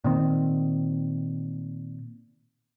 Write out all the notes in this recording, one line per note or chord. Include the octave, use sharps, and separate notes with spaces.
A#2 D#3 C4